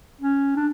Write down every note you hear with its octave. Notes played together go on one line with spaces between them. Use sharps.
C#4
D4